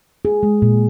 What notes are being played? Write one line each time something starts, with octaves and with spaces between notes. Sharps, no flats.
G#4
G#3
A#2